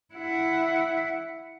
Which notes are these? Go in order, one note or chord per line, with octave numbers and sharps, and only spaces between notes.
E4 F#5